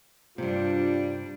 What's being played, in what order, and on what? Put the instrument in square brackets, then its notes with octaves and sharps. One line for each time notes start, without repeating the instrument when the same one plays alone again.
[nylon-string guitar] G2 C3 [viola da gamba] G3 D4 [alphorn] F4